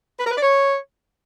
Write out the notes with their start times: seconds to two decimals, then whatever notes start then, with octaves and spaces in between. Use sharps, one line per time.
0.20 B4
0.25 A#4
0.31 B4
0.37 D5
0.43 C#5